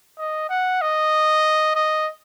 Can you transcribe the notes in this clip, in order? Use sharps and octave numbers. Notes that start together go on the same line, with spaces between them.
D#5
F#5
D#5
D#5